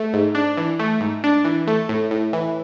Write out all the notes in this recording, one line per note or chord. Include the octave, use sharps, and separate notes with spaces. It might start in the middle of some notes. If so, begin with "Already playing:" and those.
Already playing: A3
G#2
D4
E3
A3
G#2
D4
E3
A3
A2
A2
E3